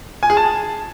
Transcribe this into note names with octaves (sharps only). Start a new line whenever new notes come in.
G#5
G#4
A5